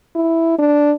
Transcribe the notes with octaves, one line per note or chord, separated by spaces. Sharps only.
E4
D4